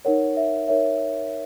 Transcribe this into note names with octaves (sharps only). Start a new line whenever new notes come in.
D#4 A#4 C#5 F#5
E5
D#4 A#4 C#5 E5